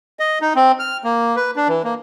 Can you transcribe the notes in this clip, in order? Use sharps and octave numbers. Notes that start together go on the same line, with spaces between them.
D#5
D#4
C4
F6
A#3
B4
D4
E3
A#3